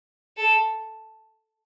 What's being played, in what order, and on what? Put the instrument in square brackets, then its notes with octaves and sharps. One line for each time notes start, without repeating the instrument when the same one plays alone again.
[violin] A4